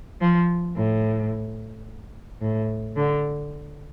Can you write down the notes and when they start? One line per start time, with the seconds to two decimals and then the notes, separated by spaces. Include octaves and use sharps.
0.21 F3
0.76 A2
2.41 A2
2.96 D3